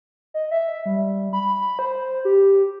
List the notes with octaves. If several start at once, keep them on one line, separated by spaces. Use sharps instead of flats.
D#5
E5
G3
B5
C5
G4